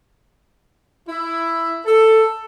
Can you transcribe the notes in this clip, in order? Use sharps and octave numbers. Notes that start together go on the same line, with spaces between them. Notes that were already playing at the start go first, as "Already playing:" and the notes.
E4
A4